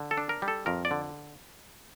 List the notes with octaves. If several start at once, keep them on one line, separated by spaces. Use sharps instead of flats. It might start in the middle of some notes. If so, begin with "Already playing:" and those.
Already playing: D3
A4
D4
A#4
G3
A4
F2 A#4
D5
D3